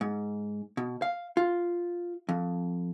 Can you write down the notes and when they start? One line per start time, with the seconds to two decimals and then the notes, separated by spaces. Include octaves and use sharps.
0.01 G#2
0.77 B2
1.02 F5
1.37 F4
2.29 F2